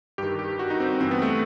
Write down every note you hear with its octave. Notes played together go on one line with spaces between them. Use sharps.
G2 D#3 G4
G4
F#4
D#4
C4
G2 E3 C4
B3
A3